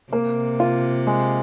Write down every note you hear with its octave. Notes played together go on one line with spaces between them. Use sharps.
C3 A#3
F4
G#3